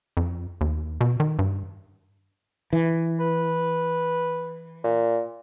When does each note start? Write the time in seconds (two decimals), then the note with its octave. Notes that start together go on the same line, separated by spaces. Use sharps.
0.17 F2
0.61 D#2
1.01 B2
1.20 D#3
1.39 G2
2.73 E3
3.20 B4
4.84 A#2